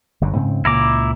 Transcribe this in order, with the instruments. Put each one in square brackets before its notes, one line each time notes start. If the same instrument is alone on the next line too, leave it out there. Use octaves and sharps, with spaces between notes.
[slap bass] G1 F#2 D3
G#2 C#3 C4
[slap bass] C#2 A#2 [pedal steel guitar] E4 A#5 D6